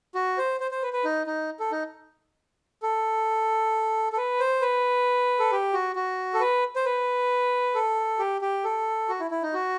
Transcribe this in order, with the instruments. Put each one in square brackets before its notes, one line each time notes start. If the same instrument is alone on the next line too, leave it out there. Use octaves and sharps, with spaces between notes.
[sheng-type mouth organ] F#4
C5
C5
C5
B4
B4
D#4
D#4
A4
D#4
A4
A4
B4
C5
B4
A4
G4
F#4
F#4
A4
B4
C5
B4
A4
G4
G4
A4
F#4
E4
E4
D#4
F#4